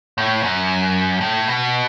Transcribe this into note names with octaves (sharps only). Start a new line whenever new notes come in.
A2
F#2
A2
B2